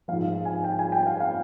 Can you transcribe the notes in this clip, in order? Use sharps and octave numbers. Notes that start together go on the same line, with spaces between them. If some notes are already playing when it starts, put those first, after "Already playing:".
G#2 F3 F5
F5
G#5
G5
G#5
G5
F5
F5